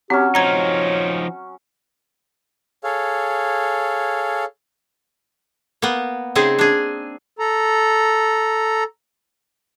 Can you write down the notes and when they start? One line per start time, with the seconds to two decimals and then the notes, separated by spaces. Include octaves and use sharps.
0.10 F#3 C4 C#4 G4
0.35 F3 D#4 C#5 A#5 G#6
2.84 G#4 A4 C#5 F5
5.82 A#3 B3
6.35 C#3 C4 D#4 G#4
6.59 D4 G#4
7.39 A4 A#5